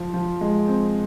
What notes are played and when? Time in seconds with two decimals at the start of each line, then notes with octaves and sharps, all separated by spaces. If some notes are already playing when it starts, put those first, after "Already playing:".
Already playing: F3
0.14 F3
0.41 G#3
0.68 C4